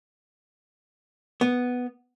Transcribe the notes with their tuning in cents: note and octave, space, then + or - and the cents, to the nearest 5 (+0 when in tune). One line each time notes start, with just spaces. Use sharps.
B3 +0